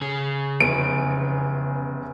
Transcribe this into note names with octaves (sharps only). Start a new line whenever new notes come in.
C#3 G#4
F1 E2 D7